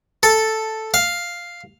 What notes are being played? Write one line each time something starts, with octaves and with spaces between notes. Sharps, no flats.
A4
F5